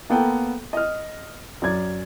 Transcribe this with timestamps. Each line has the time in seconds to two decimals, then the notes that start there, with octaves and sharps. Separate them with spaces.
0.10 A#3 B3 A4 G5
0.73 D#5 F6
1.62 F#2 D5 G#6